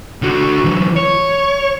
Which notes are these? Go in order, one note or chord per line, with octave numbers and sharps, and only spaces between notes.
D3 F#4
E3 F#3
C#5